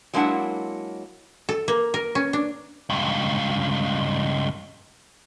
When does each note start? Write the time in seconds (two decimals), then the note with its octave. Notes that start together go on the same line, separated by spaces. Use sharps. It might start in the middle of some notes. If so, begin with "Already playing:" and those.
0.14 F#3 G#3 A#3 D4 E4 F#5
1.49 A4
1.68 A#3
1.94 A#4
2.15 C#4
2.33 D4
2.90 C#2 G2